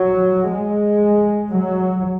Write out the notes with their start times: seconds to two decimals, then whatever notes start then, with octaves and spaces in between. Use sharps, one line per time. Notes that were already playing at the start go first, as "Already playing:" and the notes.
Already playing: F#3
0.50 G#3
1.51 F#3